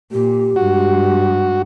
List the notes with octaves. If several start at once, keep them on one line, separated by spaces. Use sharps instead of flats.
A#2 G4
G2 G#3 F#4